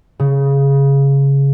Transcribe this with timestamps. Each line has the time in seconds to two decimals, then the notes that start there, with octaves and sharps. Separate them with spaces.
0.20 C#3